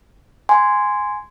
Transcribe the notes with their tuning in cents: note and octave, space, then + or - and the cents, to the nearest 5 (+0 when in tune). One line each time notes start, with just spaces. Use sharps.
G#5 +0 C6 -10